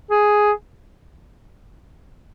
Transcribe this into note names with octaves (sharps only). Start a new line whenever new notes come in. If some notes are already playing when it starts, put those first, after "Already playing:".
G#4